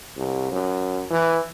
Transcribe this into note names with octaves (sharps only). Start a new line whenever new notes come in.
C2
F#2
E3